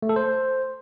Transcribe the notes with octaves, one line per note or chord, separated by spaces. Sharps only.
A3
A4
C5